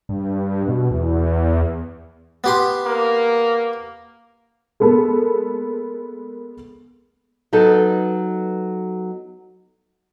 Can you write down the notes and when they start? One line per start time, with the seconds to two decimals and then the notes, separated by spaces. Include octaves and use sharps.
0.09 G2
0.67 B2
0.91 E2
2.44 B3 G4 C6
2.85 A#3
4.80 G#3 A#3 B3 A4
7.53 F#3 B3 D#4 A4